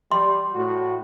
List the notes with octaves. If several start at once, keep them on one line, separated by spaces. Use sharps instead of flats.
G3 C6
A2 F#4